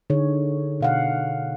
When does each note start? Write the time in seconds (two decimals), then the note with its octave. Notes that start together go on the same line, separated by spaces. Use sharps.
0.10 D3 D#4 G#4 C#5
0.81 B2 F5 F#5